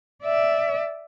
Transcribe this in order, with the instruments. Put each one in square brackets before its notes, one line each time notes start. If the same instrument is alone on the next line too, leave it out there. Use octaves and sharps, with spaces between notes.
[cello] D5 E5